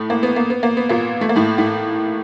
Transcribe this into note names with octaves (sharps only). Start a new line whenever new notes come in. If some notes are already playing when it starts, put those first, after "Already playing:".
Already playing: A2 A3
A#3
B3
A#3
B3
A#3
B3
A#2 A#3
A3
A#3
A2 A3
A2 A3